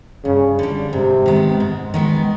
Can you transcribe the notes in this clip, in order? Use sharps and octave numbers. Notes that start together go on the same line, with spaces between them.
G2 C#3
D3 G3
G#2 C3
D#3 G#3 B3
G#2
D#3 G#3 B3